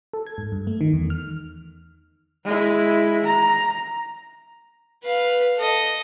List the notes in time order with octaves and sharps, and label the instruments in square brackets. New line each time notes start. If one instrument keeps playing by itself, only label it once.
[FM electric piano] A4
G#6
G#2
G2
A3
D#3
E2
F6
[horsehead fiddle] G#3 E4
A#5
[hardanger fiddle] B4 F5
A4 D#5